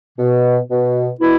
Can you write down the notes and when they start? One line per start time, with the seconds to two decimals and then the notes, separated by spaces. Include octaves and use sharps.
0.18 B2
0.69 B2
1.20 B2 E4